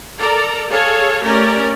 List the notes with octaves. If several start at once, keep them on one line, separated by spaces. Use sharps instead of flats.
A4 A#4 D5 A#5
G#4 A4 C#5 F5
A3 C#4 G4 A#4 D5